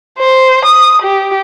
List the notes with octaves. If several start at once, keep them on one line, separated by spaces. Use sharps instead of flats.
C5
D#6
G4